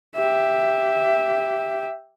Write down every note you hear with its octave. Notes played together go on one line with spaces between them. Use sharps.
G4 E5